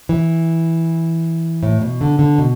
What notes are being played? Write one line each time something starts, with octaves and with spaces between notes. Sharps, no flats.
E3
A2
B2
D3
D3
B2